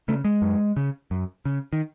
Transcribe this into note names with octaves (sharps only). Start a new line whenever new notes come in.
C#3 A3
G#3
F#2
C#3
F#2
C#3
D#3